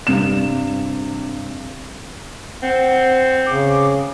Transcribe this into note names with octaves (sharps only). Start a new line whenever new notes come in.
G2 C3 E7
C4 F#5
C#3 D6